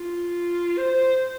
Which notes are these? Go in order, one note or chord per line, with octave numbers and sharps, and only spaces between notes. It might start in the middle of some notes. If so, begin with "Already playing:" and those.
Already playing: F4
C5